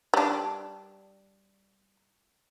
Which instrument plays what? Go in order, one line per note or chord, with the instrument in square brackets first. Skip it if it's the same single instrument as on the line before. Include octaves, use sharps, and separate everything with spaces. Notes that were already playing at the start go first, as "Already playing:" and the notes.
[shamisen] G3 D4